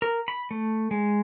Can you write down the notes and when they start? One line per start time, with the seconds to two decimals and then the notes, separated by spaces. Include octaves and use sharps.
0.02 A#4
0.28 B5
0.51 A3
0.91 G#3